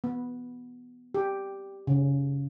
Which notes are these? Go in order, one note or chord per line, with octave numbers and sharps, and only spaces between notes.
B3
G4
C#3